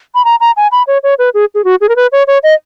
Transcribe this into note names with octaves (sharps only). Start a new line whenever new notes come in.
B5
A#5
A#5
G#5
B5
C#5
C#5
B4
G#4
G#4
F#4
G#4
A#4
B4
C#5
C#5
D#5